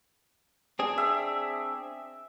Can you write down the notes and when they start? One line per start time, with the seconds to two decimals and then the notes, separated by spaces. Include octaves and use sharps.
0.79 C4 D4 G#4
0.98 E5